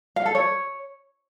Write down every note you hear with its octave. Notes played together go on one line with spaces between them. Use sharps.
F5
A4
C#5